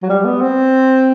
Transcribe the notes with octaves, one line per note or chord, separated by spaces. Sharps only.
F#3
G3
B3
C4